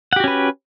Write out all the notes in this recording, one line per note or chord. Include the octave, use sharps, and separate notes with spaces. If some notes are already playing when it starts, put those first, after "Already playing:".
C#4 F#4 G4 B4 F#5